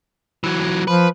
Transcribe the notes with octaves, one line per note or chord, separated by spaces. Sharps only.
E3 F#3
F3 B4